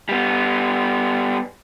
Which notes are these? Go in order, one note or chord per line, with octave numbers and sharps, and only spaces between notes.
G3 B3